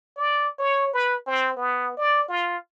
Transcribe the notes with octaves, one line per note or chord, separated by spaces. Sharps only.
D5
C#5
B4
C4
B3
D5
F4